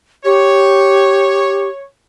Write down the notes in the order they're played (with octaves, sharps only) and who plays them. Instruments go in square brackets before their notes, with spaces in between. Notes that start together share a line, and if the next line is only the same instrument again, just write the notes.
[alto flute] G4 [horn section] C#5